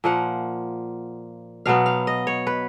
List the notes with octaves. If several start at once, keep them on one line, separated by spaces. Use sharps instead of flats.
A#2 F3 A#3 F#5
B2 F#3 B3 F5
F5
D#5
C#5
B4